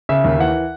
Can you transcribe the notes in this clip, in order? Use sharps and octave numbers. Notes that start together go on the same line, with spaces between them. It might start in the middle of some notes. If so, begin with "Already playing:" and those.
C#3 E5
D#2
E3 F#5